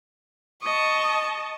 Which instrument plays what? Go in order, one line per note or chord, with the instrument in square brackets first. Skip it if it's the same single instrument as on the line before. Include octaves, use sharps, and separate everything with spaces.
[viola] D#5 A5 [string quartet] C#6